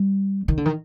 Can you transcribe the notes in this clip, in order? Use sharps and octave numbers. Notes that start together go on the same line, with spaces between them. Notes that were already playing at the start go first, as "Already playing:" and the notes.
Already playing: G3
D#3
D3
D#3